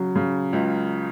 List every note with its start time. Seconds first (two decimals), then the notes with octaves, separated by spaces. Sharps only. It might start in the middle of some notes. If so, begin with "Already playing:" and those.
Already playing: C#3 F#3
0.15 C#3
0.53 C#2